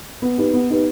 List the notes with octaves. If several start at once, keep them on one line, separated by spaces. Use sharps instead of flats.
B3
D#4 G4 B4
B3
D#4 G4 B4